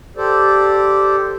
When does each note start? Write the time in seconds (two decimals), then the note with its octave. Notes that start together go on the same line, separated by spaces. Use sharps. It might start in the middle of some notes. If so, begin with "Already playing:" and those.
0.17 G4 A4 C5 D5